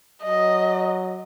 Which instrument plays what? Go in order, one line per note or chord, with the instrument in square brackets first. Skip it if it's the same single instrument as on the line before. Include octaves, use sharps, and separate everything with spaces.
[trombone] F#3 [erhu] D#5